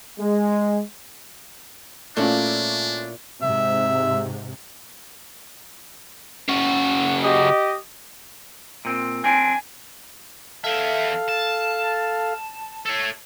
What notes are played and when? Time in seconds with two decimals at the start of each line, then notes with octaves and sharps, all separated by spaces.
0.20 G#3
2.17 A#2 A3 C#4 D4 E4 F4
3.42 G#2 C3 E5
6.48 C#3 F#4
7.21 G4 D#5
8.85 A#2 C4
9.24 C4 D4 G#5
10.64 E2 A4 E5 F5
11.28 A5
12.86 A4 C#5